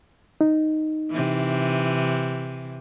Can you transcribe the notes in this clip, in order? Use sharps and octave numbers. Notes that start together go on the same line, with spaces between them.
D#4
C3 E3